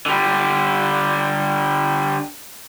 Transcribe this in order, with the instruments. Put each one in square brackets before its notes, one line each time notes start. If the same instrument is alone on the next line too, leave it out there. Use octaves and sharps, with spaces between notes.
[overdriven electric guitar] D3 G3